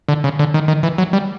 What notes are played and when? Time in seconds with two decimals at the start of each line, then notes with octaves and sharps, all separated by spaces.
0.09 D3
0.24 C#3
0.39 D3
0.54 D#3
0.68 D#3
0.83 E3
0.98 F#3
1.13 G3